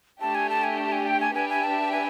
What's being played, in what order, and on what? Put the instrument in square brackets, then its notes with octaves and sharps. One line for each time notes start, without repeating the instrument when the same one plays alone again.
[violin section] A3 D4 G4 [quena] A5
[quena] G#5
A5
G#5
A5
G#5
G5
G#5
[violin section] D4 G4 B4 E5 [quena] G#5
[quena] G#5
A5
G#5